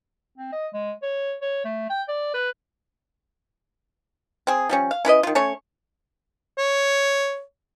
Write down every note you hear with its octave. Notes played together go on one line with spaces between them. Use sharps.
C4
D#5
G#3
C#5
C#5
A3
G5
D5
B4
C4 G#4
F3 G3 C#4
F5
C#4 E4 B4 D#5
D#3 F4
A3 C#4 C#5
C#5